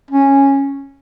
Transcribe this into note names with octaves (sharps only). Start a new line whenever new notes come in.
C#4